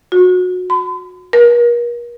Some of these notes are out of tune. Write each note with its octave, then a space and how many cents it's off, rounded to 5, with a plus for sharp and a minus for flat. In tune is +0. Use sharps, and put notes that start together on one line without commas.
F#4 -25
B5 +45
A#4 +40